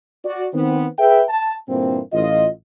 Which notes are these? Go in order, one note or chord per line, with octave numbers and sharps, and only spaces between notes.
F#4 D5
D#3 B3 C4
G#4 B4 E5 G5
A5
G2 A#2 D3 E3 A#3 C4
A1 F4 D#5